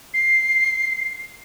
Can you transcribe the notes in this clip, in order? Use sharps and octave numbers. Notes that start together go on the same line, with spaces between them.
C7